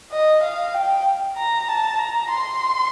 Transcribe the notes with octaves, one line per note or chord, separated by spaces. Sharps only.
D#5
F5
G5
A#5
A5
A#5
C6